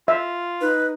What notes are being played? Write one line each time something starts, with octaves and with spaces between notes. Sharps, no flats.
F4 E5
D#4 B4